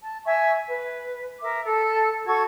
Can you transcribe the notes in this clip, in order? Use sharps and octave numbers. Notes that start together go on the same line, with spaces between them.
A5
E5 G#5 C#6
B4
A#4 E5 D6
A4 A5
F#4 A4 C#6 G#6